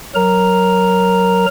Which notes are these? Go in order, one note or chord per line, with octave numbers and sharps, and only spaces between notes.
F#3 A#4 A#5